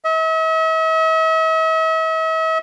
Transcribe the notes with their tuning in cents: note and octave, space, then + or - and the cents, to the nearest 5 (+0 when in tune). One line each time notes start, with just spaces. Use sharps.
E5 -45